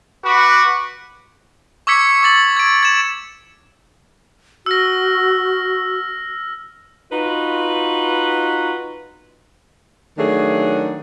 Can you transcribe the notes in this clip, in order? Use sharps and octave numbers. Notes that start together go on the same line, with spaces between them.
F#4 B4 B5 D6
C#6 D6 E6 G#6 B6 C#7
C#7
D6 A6 F#7
G#6 D7
G#6 E7
F#4 E6 F6 A#6
D#4 F4 F#4 B4
D#3 F#3 A3 D4 G#4